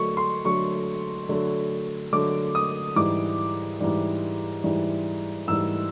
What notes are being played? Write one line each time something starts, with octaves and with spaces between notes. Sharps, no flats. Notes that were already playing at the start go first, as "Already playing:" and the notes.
Already playing: D3 F#3 A3 C#6
C6
D3 F#3 A3 C#6
D3 F#3 A3
D3 F#3 A3 D6
D#6
G#2 E3 G3 D6
G#2 E3 G3
G#2 E3 G3
G#2 E3 G3 E6